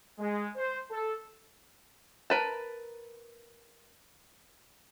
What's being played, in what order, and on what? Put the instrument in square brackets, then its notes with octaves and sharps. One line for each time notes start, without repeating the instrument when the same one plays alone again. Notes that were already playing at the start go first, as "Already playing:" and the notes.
[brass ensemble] G#3
C5
A4
[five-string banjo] A#4 B4 A5